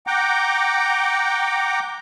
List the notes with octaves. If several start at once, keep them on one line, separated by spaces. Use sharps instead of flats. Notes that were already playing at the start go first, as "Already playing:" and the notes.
F#5 G5 A#5 D6